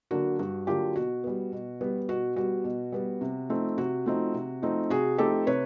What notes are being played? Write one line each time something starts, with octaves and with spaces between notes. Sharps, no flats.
D3 F#3 A#3 D4 F#4
G2 F#4
D3 F#3 A#3 D4 F4 G4
B2 F#4
G3 B3
B2
G3 B3
B2 F#4
G3 B3 F#4
B2
G3 B3
C3
F3 A3 C4 D#4
C3 F#4
F3 A3 C4 D#4
C3
F3 A3 C4 D#4
C3 F#4 G#4
F3 A3 C4 D#4 G4 A4
C3 B4 C#5